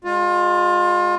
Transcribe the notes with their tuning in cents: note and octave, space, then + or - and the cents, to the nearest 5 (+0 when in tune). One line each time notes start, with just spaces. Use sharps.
G#3 -25 F4 +30